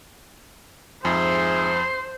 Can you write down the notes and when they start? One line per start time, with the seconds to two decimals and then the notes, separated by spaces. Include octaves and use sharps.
1.05 F2 G#2 G#4 C5 E5 C6